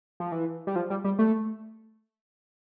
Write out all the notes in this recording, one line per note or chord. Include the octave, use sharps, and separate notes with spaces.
F3
E3
G3
F3
G3
G3
A3